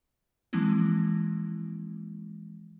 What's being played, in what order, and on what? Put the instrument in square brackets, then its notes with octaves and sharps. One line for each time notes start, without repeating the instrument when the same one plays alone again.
[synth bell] E3 F3 G#3 A#3 C4 E4